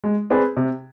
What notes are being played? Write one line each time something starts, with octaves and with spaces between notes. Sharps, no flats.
G#3
C4 G#4 B4 D5
C3